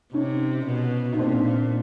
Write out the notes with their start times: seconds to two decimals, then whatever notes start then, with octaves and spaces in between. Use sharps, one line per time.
0.13 C3 C#4 D#4
0.66 B2
1.13 D#4
1.18 A#2 C4 D4